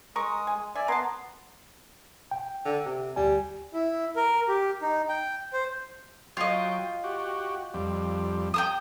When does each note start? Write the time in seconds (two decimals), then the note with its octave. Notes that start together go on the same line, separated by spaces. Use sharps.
0.16 G#3 A#4 C#6 D#6
0.47 G#5
0.75 D5 E5 G#5
0.88 B3 A#4 A5 C6
2.31 G5
2.65 D3
2.86 C3
3.16 D2 G3 G4 G#5
3.73 E4
4.16 A#4
4.48 G4
4.82 D#4
5.08 G5
5.53 C5
6.37 F#3 F4 D#5 G5
7.04 F#4 G4
7.74 F2 G3
8.54 G5 A5 D#6